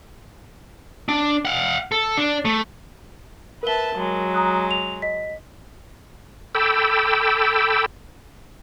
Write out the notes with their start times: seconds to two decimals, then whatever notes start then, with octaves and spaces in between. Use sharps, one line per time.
1.09 D4
1.45 F5 F#5
1.92 A4
2.17 D4
2.45 A3
3.63 A#4 B4 E5 A5 G7
3.95 F#3 G#3
4.34 A#5 D#6 F#6
4.71 F7
5.02 D#5 B6
6.55 A4 G5 B5 D6 E6